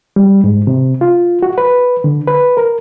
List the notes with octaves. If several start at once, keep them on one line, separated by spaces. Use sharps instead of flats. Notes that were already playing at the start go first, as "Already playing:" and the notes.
G3
G#2
C3
F4
F#4
B4
D3
B4
A#4